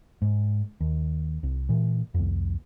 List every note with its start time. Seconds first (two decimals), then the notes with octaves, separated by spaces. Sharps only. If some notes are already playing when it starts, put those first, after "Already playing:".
0.22 G#2
0.81 D#2
1.43 C2
1.69 A#2 E3
2.14 C2 F2